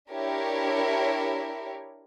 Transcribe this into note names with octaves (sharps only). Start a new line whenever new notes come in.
D4 E4 G4 A#4 C#5